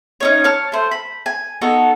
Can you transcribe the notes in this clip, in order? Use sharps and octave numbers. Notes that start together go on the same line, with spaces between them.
C#4 D#4 C#5
C#5 A5 F6
A3 C5
B5
G#5
B3 D#4 F#4 A4